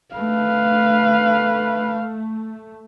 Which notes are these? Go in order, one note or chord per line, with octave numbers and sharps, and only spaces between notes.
A3 B4 F5